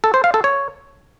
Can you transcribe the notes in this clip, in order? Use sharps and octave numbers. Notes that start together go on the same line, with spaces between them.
A4
C5
F5
A4
C#5